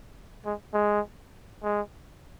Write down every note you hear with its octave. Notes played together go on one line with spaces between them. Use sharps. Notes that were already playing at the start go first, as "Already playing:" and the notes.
G#3
G#3
G#3